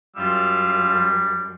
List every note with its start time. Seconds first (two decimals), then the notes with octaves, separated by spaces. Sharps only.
0.16 F#2 G3 F4 F5 E6